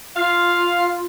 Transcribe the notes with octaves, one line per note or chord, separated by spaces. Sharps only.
F4 F5